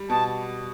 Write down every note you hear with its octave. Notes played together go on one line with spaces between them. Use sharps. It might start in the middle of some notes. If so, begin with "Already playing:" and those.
Already playing: G3
B2 A5